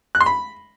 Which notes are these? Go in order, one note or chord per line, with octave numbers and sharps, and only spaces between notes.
F#6
C6
B5